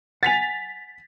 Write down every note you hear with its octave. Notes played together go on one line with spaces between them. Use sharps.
F#5 G#5 A6 B6 F7